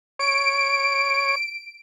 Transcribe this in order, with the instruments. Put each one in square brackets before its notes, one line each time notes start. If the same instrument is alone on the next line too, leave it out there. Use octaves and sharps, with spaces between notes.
[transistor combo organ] C#5 [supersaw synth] D7